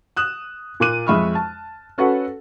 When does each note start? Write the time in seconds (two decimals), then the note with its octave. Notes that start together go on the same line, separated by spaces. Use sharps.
0.17 D#6 F#6 E7
0.80 A#2 A#3 D6 F#6 D#7
1.07 F2 G#3 E5 B5 C#6 F6
1.35 A5
1.98 C#4 F#4 A4 B4 F#5